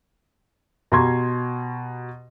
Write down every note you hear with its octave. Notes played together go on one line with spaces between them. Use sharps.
B2 G4 A#5 C6 C#6 G#6